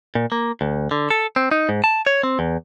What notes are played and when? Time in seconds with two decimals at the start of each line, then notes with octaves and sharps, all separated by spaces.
0.15 A#2
0.32 A#3
0.61 D2
0.91 D3
1.10 A4
1.36 C4
1.51 D#4
1.69 G#2
1.84 A5
2.06 C#5
2.23 C4
2.39 E2